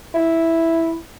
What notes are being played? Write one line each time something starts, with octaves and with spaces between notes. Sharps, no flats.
E4